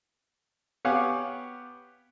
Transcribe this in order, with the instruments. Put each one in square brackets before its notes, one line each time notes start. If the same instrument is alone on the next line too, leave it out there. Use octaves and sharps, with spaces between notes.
[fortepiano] B3 G4 C#5 F5 F#5 G#5